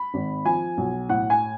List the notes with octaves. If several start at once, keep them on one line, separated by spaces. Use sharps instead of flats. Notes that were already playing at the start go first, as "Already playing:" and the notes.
Already playing: B5
G#1
F3 G#5
B1
A2 F#5
G#5